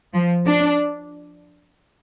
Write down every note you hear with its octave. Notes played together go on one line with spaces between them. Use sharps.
F3
D4